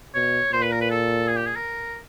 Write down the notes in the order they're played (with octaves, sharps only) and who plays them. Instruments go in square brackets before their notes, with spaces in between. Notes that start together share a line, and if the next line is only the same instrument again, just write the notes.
[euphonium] B2 [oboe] C#5
[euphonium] A#2 [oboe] C5
[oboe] B4
A#4
B4
A4
G#4
G4
G#4
A#4